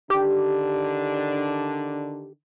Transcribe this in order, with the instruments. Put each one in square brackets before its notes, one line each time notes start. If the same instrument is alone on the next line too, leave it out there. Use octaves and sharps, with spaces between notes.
[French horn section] D3 D#3 D4 [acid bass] G4